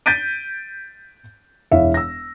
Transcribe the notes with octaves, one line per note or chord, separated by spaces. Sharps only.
G6 A6 B6 D7 D#7
E1 E4 C#5 E5 F5
E6 A#6